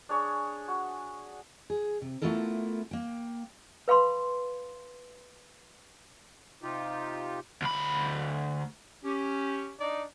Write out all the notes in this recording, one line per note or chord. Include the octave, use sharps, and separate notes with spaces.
D4 G#4 C#5
F#4
G#4
C3
A3 B3 E4 F4 A4 A#4
A#3 G5
B4 F5 B5 C6
C3 D#4 F4 G4
D2 B5
C#4 G4
D4 D#4 D5